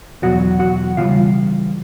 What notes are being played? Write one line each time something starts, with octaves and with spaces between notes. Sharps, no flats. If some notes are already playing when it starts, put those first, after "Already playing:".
E2 B2 F#3 F#4 F#5
F#4 F#5
C#3 E3 G3 F4 F5